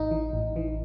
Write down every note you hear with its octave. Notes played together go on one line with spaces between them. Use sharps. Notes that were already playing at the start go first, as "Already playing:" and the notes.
Already playing: A1 D#4
E3
A1
E3